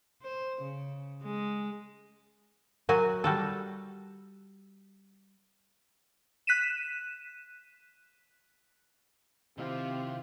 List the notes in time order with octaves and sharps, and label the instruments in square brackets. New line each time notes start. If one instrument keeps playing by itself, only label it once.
[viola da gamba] C5
C#3
G#3
[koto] F#3 F#4 G#5 [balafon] A#4
[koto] G3 F#4 A4
[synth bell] F#6 B6 D#7 E7
[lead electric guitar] C3 [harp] D#3 E4 F5 [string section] C4 F4 [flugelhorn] G4